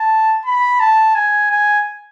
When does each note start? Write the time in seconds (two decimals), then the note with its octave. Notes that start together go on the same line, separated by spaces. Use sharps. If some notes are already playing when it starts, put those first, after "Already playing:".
Already playing: A5
0.45 B5
0.80 A5
1.15 G#5
1.50 G#5